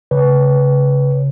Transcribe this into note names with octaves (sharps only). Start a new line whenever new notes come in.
C#3 B4 C#5